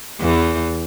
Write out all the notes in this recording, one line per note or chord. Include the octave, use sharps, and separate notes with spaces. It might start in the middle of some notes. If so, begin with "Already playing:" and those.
E2 E3